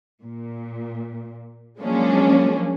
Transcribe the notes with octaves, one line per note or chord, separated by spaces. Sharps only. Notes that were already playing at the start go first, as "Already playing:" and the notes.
A#2
F3 F#3 G#3 A#3 C#4 D4